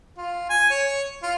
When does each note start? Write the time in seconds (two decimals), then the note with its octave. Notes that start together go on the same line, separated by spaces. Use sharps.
0.18 F4
0.50 G#5
0.70 C#5
1.23 F4